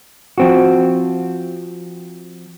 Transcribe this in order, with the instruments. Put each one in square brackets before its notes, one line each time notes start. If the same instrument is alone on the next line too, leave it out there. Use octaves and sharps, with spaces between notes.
[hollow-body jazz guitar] F3 C4 F#4